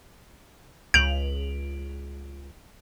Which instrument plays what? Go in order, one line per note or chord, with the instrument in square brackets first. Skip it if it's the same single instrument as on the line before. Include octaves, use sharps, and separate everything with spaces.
[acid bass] C#2 [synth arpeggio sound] G6 [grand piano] D7 F7 F#7